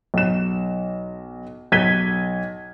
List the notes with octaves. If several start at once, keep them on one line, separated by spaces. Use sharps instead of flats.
B1 E7
B1 G#6 B6 D#7 G7